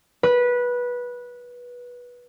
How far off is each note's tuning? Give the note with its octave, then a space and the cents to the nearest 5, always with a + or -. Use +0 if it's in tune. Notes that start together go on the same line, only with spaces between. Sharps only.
B4 -15